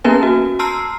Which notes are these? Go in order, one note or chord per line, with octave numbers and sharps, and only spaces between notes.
A#3 B3 C#4 A#4 B4 G#5
F#4
A5 A#5 C6 E6 F6 C7